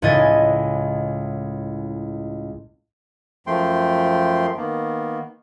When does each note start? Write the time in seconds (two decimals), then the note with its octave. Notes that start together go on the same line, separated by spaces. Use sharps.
0.02 C#2 A2 E4 D#5 G#5 A6
3.47 F#2 F3 A3 G5 C6
4.57 D#3 A#3 B3